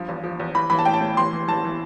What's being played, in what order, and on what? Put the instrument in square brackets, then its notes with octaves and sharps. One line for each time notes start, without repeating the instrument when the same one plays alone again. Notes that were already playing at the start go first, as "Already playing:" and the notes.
Already playing: [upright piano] G2 F3
E2
F3
E2
E3 B5
E3 B5
A5
A2 G5
A5
A2
E3 C6
E3
E3 A5
E3